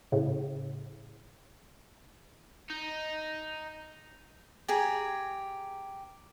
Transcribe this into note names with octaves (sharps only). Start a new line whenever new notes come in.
A2 C#3
D#4
G4 G#4 A#5